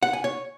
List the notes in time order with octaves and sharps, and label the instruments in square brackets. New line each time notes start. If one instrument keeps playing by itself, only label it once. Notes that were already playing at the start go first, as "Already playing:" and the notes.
[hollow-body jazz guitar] F#5
G#5
C#5